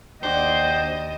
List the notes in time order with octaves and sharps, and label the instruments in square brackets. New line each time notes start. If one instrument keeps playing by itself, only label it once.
[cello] D#2 D#5 [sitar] D4 F#4 [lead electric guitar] C5 [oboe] G5